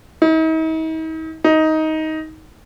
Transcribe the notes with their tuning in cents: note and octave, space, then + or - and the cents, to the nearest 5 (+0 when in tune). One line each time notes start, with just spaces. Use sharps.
D#4 +45
D#4 +15